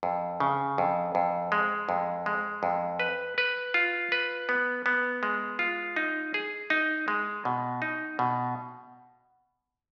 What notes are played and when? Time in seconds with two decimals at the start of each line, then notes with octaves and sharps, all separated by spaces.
0.03 F2
0.40 C#3
0.78 F2
1.15 F2
1.52 G#3
1.89 F2
2.26 G#3
2.63 F2
3.00 B4
3.38 B4
3.74 F4
4.12 B4
4.49 B3
4.86 B3
5.23 G#3
5.59 F4
5.96 D#4
6.34 G#4
6.70 D#4
7.08 G#3
7.45 B2
7.82 D#4
8.19 B2